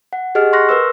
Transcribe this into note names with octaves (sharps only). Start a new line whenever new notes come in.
F#5
G4 G#4 D#5 F#5 F6
C6 C#6 F6 F#6 A#6
A#4 B4 E6